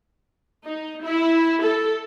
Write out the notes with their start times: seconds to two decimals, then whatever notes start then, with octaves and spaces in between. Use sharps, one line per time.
0.65 D#4
1.03 E4
1.62 A4